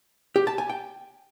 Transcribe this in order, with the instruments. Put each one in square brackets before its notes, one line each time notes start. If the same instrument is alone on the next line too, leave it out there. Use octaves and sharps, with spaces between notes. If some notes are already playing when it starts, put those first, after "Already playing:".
[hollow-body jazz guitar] G4
A5
G#5
G5